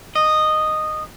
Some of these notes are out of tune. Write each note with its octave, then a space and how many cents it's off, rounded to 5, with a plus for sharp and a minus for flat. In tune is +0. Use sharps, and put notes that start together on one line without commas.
D#5 -10